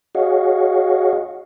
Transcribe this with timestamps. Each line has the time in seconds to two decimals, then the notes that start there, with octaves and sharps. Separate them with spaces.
0.15 F#4 G#4 C#5 D#5 F5 F#5